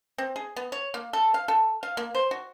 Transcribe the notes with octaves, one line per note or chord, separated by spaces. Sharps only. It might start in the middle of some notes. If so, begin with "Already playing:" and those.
C4
G#4
B3
C#5
A#3
A4
F5
A4
F5
A#3
C5
F#4